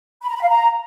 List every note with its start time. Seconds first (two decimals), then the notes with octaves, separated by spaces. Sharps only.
0.22 B5
0.29 A#5
0.36 B5
0.42 F5
0.49 A#5